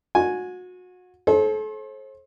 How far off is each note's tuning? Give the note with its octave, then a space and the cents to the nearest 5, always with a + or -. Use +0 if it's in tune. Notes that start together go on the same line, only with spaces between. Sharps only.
F#4 -30 G#5 +0
A4 -35 C5 +40